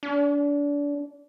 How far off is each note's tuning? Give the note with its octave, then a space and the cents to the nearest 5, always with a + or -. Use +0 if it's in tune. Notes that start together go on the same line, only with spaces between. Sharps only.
D4 -30